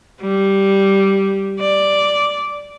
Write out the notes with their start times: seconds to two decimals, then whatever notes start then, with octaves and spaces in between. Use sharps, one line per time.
0.21 G3
1.60 D5